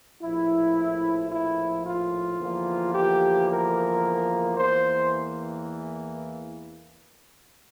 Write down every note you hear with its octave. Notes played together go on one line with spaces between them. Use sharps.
A#1 A2 F3 E4
E4
F4
E2 D3 F3 A#3
G4
A#4
E2 E3 A#3 C5